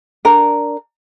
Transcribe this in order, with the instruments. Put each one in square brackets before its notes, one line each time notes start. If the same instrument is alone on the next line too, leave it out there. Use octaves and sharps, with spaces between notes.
[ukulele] D4 A#4